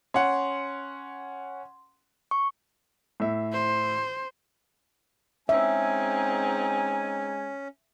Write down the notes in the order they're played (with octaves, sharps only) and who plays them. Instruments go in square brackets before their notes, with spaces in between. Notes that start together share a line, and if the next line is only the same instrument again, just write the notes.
[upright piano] C#4 F#5 [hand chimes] C6
[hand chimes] C#6
[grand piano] A2 E5
[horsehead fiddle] C5
[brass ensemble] G#3 G#5 [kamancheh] C4 D#4 [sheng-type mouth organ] C#4 [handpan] E5